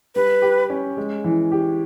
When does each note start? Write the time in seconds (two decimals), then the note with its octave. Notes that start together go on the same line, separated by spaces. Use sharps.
0.15 G3 B4
0.42 G4
0.70 C#4
0.97 G#3
1.24 E3
1.52 G4